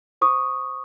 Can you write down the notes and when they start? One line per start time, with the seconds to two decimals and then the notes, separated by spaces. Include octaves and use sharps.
0.21 C5 C#6 D#6